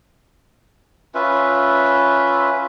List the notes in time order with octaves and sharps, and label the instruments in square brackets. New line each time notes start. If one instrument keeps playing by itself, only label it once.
[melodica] C#4 F4 B4 E5